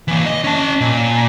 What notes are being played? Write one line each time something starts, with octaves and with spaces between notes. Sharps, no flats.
E3 A#3
D#5
C#4 A5
A#2